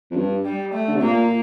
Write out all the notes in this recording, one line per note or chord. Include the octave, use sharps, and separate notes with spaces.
F2
G2
G3
A3
D3
C3
A#2 A#3